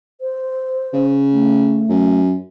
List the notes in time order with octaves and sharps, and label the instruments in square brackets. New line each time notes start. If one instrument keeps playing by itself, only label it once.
[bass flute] C5
[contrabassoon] C#3
[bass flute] A3
[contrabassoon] F#2